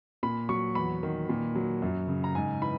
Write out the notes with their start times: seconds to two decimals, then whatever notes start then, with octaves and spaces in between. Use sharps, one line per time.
0.23 A#2 B5
0.49 F#3 C#6
0.75 E2 B5
1.03 D#3
1.29 A#2
1.55 F#3
1.82 F#2
2.08 C#3
2.24 A#5
2.35 G#2 G#5
2.62 E3 B5